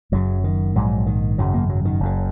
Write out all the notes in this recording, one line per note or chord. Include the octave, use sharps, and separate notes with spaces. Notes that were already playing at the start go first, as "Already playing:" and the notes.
F#1 F#2 C#3 F#3
D#3
A#1 G#2 F#3
D#3
G#1 F#2 C#3 F#3
A#3
F#3
D#3
F#1 F#2 C#3